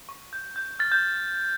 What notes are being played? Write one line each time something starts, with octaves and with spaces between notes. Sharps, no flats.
C#6
G6
G6
F6 A6
G6